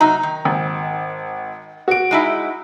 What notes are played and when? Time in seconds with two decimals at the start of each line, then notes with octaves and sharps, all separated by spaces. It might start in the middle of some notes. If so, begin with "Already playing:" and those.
0.01 C3 F#3 D#4 A#5
0.23 D#3
0.45 G#1
1.88 F#4 D7
2.11 G#3 D#4 E4